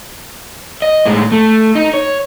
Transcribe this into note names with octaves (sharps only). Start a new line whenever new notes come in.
D#5
A2 G#3
A3
D#4
C#5